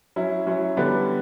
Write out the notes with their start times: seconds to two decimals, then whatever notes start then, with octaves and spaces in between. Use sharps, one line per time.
0.16 F#3 C#4 E4
0.47 F#3 C#4 E4
0.77 D3 G3 B3 D4